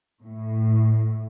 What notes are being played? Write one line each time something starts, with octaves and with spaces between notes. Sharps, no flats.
A2